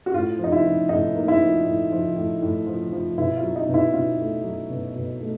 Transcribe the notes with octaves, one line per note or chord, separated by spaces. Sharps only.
F#4
A2 F4
F3
D#4
E4
F3
A2 D#4
A#3
E4
F3
A2
F3
A2
A2
F3
F3
B2 E4
F4
F#3
D#4
B2
E4
B2 F4
A3
F#3
B2
B2
A3